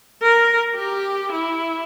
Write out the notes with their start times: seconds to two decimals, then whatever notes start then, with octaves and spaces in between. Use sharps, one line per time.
0.22 A#4
0.75 G4
1.32 E4